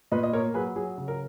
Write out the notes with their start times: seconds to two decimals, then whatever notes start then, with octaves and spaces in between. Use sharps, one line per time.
0.12 A#2 B4 D#5
0.23 D#5
0.33 A#3 A#4 C#5
0.54 F#3 G#4 B4
0.76 F#3 G#4
0.98 C#3
1.08 A#4